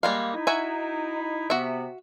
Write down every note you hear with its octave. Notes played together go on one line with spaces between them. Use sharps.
G3 G#3 A#3 F5
D#4 E4
F#4 E5 G#5
C3 B3 F#4 E5